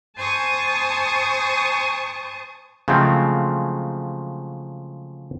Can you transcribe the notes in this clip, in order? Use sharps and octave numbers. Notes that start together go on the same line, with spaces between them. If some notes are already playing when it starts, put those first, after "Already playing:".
C5 G#5 A5 C#6 D#6
C#3 F3 F#3 G#3 A3 C4